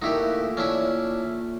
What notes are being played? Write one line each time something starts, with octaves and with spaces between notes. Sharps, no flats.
A#2 A3 D#4 E4 G4 F#5
C#4 D4 E4